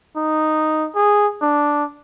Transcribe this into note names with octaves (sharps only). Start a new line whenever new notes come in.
D#4
G#4
D4